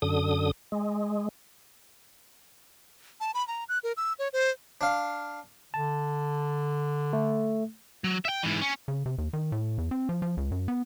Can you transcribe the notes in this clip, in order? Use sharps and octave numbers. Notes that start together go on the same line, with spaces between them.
F#2 D3 D#6
G#3
A5
B5
A#5
F#6
A#4
E6
C#5
C5
D4 F5
D3 A5
A3
F#3
E5 G5
G#2 E3
C#4
C#3
C3
D#2
D#3
A2
E2
C4
F3
F3
C#2
F#2
B3